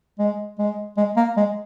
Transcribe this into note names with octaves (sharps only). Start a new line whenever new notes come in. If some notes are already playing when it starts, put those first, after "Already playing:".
G#3
G#3
G#3
A#3
G#3